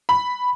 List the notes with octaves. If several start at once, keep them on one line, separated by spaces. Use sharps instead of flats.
B5